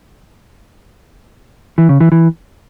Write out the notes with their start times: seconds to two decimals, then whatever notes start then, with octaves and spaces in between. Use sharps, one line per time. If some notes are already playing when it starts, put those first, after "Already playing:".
1.78 E3
1.89 C#3
2.00 E3
2.12 E3